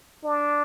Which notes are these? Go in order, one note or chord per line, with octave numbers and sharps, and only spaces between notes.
D4